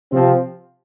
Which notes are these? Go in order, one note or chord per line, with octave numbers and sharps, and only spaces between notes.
C3 F3 C4